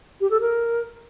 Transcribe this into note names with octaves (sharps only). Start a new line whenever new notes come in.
G4
A4
A#4